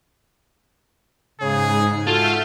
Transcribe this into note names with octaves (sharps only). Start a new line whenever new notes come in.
G#2 C#3 G#4
F4 F#4 A4 E5 A5 F6 G6